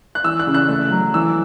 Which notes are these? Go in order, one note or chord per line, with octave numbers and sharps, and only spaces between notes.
F#6
E3 E6
F#6
C#3
F#6
A3
F#3
E3 E6